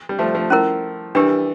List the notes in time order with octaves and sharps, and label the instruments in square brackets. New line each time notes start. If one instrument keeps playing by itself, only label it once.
[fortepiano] G3
F3 A3
F3 A3
[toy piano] C#4 E4 A#4
[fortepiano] E3 G3 [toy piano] D4 G4 A#4